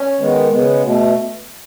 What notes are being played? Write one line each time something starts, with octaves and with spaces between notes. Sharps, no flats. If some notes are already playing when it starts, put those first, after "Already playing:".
Already playing: C#4
D#3 G#3 B3
C#3 G#3 B3
B2 A3